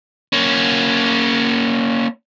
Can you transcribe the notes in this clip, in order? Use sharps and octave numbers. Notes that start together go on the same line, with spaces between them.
A#3 C#4